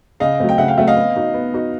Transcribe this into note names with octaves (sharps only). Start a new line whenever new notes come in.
C#3 D#5 F5
F#3 A3 C4
G5
C#3 E5 F#5
F5 G5
F#3 A3 C4 E5 F#5
D#5 F5
B3
D#4 F#4
B3
D#4 F#4